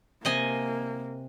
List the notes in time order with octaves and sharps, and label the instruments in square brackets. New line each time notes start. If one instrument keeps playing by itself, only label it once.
[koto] C3 D#5 G#5 [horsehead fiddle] A#3